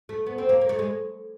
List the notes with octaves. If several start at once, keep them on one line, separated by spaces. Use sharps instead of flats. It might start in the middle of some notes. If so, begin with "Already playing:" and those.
A3
B3
C4
A#3
A#3
A3
G#3